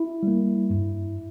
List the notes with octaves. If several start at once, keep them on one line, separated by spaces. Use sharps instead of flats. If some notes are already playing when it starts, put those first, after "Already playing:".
Already playing: E4
G3 A#3
G2